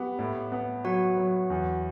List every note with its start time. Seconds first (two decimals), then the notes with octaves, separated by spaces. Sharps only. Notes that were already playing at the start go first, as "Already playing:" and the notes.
Already playing: B3 G4
0.19 A2
0.52 B3
0.85 F#3 F#4 F#5
1.17 F#3
1.50 E2